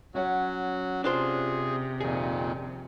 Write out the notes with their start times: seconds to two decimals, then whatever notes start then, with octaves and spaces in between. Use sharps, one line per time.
0.15 F#3 C#4 F#4 F#5
1.04 C3 D4 F4 G#4 C5
2.01 F2 A#2 D#3 G#4